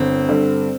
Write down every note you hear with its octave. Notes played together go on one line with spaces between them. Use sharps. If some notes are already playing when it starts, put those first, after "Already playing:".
Already playing: G1 C4
G2 D3